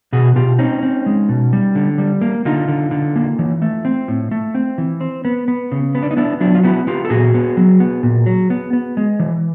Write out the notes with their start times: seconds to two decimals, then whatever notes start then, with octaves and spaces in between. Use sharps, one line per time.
0.13 B2 F#4 G#4
0.36 B2 F4 G4
0.59 C4 C#4 D#4
0.83 C4
1.06 G#3
1.29 B2
1.53 G3
1.75 D3
1.98 G3
2.21 A#3
2.45 D3 D#4 F4
2.68 D3
2.91 D3
3.16 A#3
3.39 E3
3.62 A3
3.85 C4
4.08 A2
4.31 A3
4.55 C4
4.78 E3
5.01 C4
5.25 B3
5.48 B3
5.71 C#3
5.95 B3
6.03 D4
6.11 D#4
6.17 B3 D4 E4
6.40 F#3 D4 E4
6.55 F4
6.63 B3 E4 F#4
6.87 B3 F4 G4
7.05 A4
7.10 A#2 F#4 G#4
7.34 B3
7.57 F#3
7.80 B3
8.03 A#2
8.26 F#3
8.50 B3
8.73 B3
8.97 G#3
9.19 E3